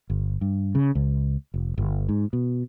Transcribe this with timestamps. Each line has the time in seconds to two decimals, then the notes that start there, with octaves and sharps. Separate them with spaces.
0.10 G1
0.41 G2
0.75 C#3
0.95 C#2
1.54 F1
1.78 G1
2.09 G#2
2.33 B2